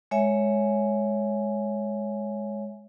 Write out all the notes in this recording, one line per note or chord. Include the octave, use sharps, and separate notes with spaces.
G#3 C#5 E5 G#5